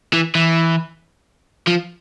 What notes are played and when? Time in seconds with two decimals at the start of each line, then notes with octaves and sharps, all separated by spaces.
0.13 E3
0.35 E3
1.68 F3